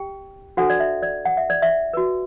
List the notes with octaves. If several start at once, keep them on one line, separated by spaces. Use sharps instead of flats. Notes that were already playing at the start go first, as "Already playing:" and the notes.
Already playing: G4 G5
D4 F#4 A4 C5 F#5
D5
E5
D5
F#5
E5
D5
E5
F#4 B4